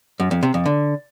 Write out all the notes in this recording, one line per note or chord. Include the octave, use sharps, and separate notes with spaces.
F#2
F2
C3
F2
D3